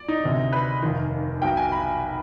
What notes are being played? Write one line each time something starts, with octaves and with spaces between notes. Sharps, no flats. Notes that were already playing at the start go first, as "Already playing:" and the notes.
Already playing: D5
D#4
D2 C3 D#3
B4
F1 D#2 D#3
B1 B2 G5
G#5
B5